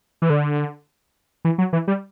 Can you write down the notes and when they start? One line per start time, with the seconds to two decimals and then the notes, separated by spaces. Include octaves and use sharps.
0.22 E3
0.30 D3
1.45 E3
1.58 F#3
1.73 E3
1.88 G3